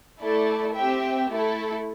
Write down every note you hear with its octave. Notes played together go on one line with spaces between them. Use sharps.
A3 E4 A4 D5
C4 G4 E5 G5
A3 E4 A4